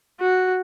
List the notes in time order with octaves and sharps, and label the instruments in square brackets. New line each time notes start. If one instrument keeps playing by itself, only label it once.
[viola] F#4